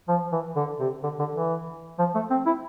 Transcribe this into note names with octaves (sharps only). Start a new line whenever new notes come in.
F3
E3
D3
C3
D3
D3
E3
F3
A3
C4
E4